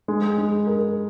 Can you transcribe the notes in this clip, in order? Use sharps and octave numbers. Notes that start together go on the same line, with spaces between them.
G#3
G#3
A#4